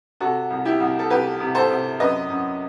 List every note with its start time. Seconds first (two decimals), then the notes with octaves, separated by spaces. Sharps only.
0.20 C3 F#4 A4
0.50 C2
0.65 E4 G4
0.80 C2
0.99 A4
1.10 C2 G4 B4
1.40 C3
1.55 A4 C5
1.70 C3
2.00 F#2 B4 D#5
2.30 F#2